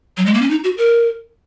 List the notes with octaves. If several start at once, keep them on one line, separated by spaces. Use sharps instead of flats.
F#3
G#3
A#3
C#4
D#4
F#4
A#4